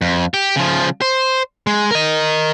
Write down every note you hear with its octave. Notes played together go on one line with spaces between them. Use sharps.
F2
G4
C#3 F3
C5
G#3
A#4 D#5